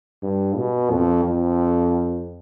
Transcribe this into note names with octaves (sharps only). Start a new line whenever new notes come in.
G2
B2
F2
F2